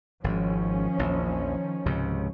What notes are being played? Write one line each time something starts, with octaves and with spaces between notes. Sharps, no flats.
G#1 G#2 D#3 F3 C#4
A#1 E2
C#2 G#2 C3